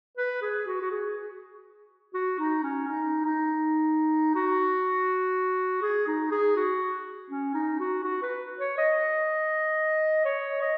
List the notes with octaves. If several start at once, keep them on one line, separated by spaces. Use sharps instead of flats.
B4
G#4
F#4
F#4
G#4
F#4
D#4
C#4
D#4
D#4
F#4
G#4
D#4
G#4
F#4
C#4
D#4
F#4
F#4
B4
C#5
D#5
C#5
D#5